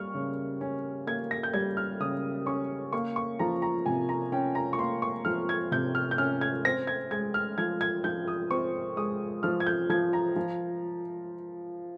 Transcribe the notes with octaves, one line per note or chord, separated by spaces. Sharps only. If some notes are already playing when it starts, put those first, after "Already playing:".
Already playing: G3 A#3 C#6 F6
C#3
C#4
A#3 G#6
A#6
G6
G3 G#6
F6
C#3 D#6
C#4 C#6
A#3 C#6
C#6
F3 A#5
A#5
C3 G#5
A#5
C#4 G5
A#5
C#6
A#3 C6
C#6
F3 F6
G#6
C3 G6
F6
G6
C#4 F6
G#6
C4 A#6
G#6
G#3 G#6
F6
F3 G#6
G#6
F3 G6
D#6
C4 C#6
G#3 D#6
F3 F6
G#6
G6
F3 G#6
A#5
F3